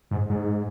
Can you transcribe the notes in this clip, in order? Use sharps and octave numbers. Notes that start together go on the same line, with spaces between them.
G#2
G#2